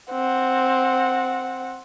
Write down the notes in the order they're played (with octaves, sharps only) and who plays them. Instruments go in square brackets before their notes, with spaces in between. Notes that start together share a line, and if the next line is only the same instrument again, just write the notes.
[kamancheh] C4 F#5